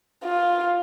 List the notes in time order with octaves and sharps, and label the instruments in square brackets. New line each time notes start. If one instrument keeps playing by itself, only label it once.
[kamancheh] F4